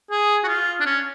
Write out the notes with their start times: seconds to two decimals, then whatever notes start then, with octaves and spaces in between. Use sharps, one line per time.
0.11 G#4
0.44 F#4
0.48 F4
0.80 D4
0.86 C#4